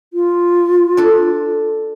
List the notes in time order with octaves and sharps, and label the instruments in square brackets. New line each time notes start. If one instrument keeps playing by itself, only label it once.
[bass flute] F4
[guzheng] D4 A4